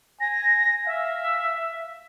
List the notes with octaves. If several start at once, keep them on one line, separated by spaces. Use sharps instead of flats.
G#5 A#6
E5 F5